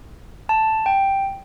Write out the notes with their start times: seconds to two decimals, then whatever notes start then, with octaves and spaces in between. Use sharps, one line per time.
0.49 A5
0.86 G5